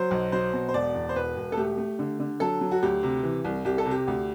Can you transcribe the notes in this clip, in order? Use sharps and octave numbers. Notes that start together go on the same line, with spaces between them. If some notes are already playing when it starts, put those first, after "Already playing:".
Already playing: F#3 C5
B1
F#3 C5
B2
C5
E1 D5
E2
C5
E1 B4
E1
A4
A3 G4
A3
D3
D3
F#3 A4
F#3
F#4
D2 G4
C3
E3
C2
C2 G4
A4
C3
G4
D2